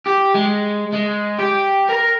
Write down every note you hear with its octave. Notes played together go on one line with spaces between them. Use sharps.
G4
G#3
G#3
G4
A#4 A#5